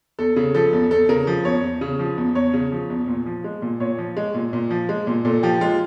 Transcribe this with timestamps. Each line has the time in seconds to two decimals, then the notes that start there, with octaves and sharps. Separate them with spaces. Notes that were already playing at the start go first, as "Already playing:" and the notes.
0.19 E2 A4
0.36 C#3
0.55 F3 A4
0.73 E2
0.91 E2 A4
1.09 C#3 A#4
1.27 F3
1.45 E2 C#5
1.63 E2
1.81 C#3
1.99 F3
2.18 E2
2.35 E2 C#5
2.53 C#3
2.72 F3
2.90 E2
3.08 A#2
3.26 F3
3.44 G#3
3.62 A#2
3.80 A#2 C#5
3.98 F3
4.17 G#3
4.34 A#2
4.53 A#2
4.70 F3
4.89 G#3
5.07 A#2
5.25 A#2 A4
5.43 F3 G4
5.61 G#3 F4